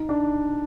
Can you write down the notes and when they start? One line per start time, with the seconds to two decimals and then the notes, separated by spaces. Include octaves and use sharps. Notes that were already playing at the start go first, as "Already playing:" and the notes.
Already playing: D#4
0.09 D4